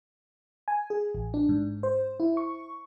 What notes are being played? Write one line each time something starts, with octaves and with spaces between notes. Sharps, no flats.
G#5
G#4
A1
D4
G#2
C5
E4
C#6